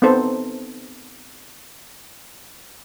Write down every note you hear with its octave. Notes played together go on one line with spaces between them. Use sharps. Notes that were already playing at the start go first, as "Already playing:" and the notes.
B3 C4 D#4 A4 C5